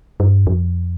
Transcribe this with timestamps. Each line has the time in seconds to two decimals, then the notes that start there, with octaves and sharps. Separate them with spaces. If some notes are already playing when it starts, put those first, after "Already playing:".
0.20 G2
0.47 F2